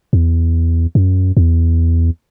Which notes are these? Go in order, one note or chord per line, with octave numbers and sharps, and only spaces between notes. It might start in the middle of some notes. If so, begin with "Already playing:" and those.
E2
F#2
E2